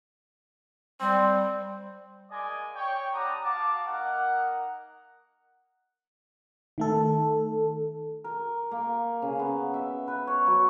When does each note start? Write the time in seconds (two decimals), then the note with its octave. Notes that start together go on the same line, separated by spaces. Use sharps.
1.01 G3 C4
2.30 G#3 A#3 D5 D#5 G#5 D6
2.75 C#5 G5
3.13 G3 D4 F#5 A#5 D6 D#6
3.43 F#4 F5 A5 D6
3.86 A#3 D#4 A#4 F#5
6.78 D#3 A3 A4
8.24 A#4
8.71 A#3
9.22 C#3
9.39 B3
9.74 E5
10.08 B4
10.27 C#5
10.46 F#3